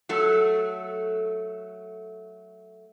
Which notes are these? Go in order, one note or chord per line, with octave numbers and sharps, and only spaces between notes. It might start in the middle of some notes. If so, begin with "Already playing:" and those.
F#3 A3 A4